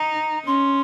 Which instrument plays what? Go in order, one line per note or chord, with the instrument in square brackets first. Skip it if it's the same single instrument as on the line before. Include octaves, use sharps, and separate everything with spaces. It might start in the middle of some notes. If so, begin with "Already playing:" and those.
Already playing: [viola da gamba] D#4 [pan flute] A#5
[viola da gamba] C#4 [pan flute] C6